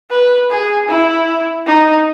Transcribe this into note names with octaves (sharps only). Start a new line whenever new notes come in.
B4
G#4
E4
D#4